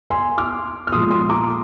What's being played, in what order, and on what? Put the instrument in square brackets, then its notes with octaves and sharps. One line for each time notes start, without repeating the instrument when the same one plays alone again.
[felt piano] G#5 C6
D6 F6
F6
A#2 F3 G#3 C6 D#6
C6 D#6
A#5 D6